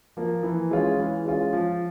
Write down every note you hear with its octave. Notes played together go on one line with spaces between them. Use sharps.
F3 A#3
E3
G#3 C#4 F4
E3
G#3 C#4 F4
F3